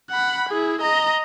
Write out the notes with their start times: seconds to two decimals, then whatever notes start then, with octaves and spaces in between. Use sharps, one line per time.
0.10 F#5 B5
0.49 E4 G#4
0.81 D#5 A#5